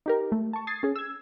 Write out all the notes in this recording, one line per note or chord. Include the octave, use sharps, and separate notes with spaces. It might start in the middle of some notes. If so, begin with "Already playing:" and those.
D#4 G4 A#4
A3
A5 C#6
D#6 G#6 A6 C7
C#4 G#4
E6 G#6